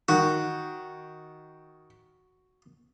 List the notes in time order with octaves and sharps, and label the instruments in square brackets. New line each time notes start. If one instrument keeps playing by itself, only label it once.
[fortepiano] D#3 [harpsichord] F#4